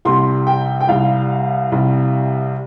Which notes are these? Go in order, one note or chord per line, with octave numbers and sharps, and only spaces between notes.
C2 C3 G3 C6
G5
G5
C2 C3 G3 F5
C2 C3 G3